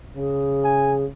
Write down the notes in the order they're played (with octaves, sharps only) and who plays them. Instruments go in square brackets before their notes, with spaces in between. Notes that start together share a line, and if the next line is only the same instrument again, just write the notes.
[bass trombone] C#3 [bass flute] G#4
[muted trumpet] G#5